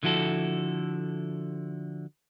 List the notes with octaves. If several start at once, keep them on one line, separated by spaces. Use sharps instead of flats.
D3 F3 E4 F#4 A4